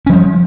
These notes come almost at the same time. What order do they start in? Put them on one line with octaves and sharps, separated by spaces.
C#4 F3 G3